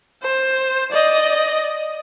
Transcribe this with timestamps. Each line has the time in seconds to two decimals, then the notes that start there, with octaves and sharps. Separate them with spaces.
0.23 C5
0.92 D5 D#5